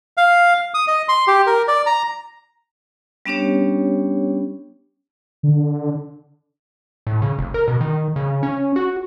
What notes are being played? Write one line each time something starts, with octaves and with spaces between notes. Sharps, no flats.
F5
D#6
D#5
C6
G4
A#4
D5
A#5
G3 B3 C#4 D4 G4 C#5
D3
A2
C#3
F1
A#4
B2
D#3
C#3
C#4
F#4